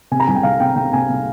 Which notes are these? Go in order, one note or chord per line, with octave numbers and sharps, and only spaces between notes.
C3 G#5
A#5
C2 G#5
G5
C2 F5
C3 G5
C3 G5
C3 G#5
C3